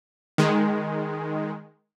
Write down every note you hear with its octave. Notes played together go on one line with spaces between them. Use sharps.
D#3 G#3